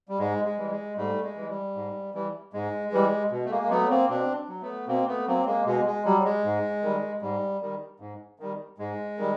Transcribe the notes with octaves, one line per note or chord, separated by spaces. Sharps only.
G3
G#2 G#3
G#3
E3 G3
G#3
G#2 G3 A3
G#3
E3 G3
G3
G#2
E3 G3
G#2 G#3
E3 G3
B2
A3
G#3 A#3
A#3
F#3 A3 B3
A#3 C4
B2 C4 D4
F#3
A3 B3
B2 A#3 C4
A3 B3
F#3 A#3 C4
G#3 A#3
B2 G#3
G#3
F#3 G3
G#3
G#2
D#3 G3
G#2 G3
D#3 G3
G#2
D#3 G3
G#2 G#3
D#3 G3